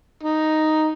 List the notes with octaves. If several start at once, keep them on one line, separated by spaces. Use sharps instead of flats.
D#4